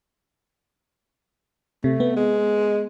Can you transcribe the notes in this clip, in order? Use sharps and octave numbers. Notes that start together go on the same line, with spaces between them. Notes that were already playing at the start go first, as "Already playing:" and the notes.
C3 A3
B3
G#3